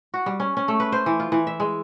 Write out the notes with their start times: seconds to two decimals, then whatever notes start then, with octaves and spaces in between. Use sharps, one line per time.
0.14 F#4
0.26 G3
0.40 C#4
0.57 C#4
0.68 A3
0.80 B4
0.92 C5
1.06 E3
1.20 F4
1.32 E3
1.47 E5
1.60 G#3